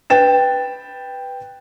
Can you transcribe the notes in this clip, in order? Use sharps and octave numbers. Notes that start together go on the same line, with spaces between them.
B4 G5 A6 E7